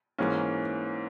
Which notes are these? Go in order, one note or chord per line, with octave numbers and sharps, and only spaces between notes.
G#2 E3 A#3 C#4